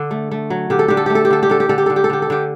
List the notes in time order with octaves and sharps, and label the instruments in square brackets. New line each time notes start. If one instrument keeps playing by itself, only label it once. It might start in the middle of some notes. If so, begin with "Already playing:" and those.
Already playing: [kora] D3
A3
A3
F#3
D3 G4
A4
D3 G4
A4
A3 G4
A4
G4
D3 A4
G4
D3 A4
G4
D3 A4
G4
D3 A4
G4
A4
D3 G4
A4
D3 G4